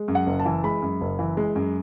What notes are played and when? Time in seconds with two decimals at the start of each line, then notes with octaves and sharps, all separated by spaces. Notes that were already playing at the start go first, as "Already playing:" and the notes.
Already playing: G#3
0.08 F#2
0.15 F#5
0.27 F#1
0.40 A5
0.45 E3
0.64 G#3 B5
0.82 F#2
1.01 F#1
1.19 E3
1.37 G#3
1.56 F#2